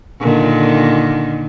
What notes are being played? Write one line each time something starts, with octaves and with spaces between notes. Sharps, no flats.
A#2 D3 D#3